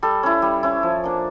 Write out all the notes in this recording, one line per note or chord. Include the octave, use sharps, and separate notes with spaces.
G3 A4
C#4 E4
G3
C#4 E4
F3
A#3 D4